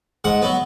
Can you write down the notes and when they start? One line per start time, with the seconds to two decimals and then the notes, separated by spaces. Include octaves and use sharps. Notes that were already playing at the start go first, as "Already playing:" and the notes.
0.24 G#2 F#5
0.42 F#3 B3